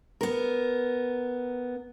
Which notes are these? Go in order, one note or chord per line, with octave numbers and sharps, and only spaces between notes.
B3 A#4